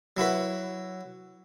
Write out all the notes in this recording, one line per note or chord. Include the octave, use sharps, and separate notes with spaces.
F#3 E4 F#4 B4